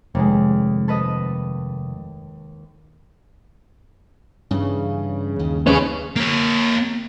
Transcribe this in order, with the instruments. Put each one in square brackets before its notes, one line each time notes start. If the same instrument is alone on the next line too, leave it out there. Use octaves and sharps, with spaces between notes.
[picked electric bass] F1 [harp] D#2 G#3
[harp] A4 B4 D#5
[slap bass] G2 E3 [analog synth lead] C#3
[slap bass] D#2
[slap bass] D#2 [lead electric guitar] C#4 G#4 [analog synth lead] B4
[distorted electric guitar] A#3 C#5